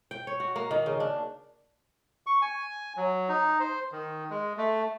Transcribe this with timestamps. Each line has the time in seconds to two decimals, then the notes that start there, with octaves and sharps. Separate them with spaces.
0.11 G5
0.27 C#5
0.40 F#4
0.56 A#3
0.71 D#3
0.86 C#3
1.00 D4
2.27 C#6
2.42 G#5
2.97 F#3
3.29 D#4
3.60 C5
3.92 D#3
4.30 G#3
4.58 A3